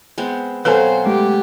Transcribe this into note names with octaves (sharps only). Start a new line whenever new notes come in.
G#3 B3 C4
B2 F#3 C4 A4 B4 C5 F5 G#5
G#3 A3 G4